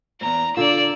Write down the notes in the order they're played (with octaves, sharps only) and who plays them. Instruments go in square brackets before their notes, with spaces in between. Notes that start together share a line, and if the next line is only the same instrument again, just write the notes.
[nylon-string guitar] E2 G#2 [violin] A#5
[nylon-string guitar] D3 F4 [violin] D5 E6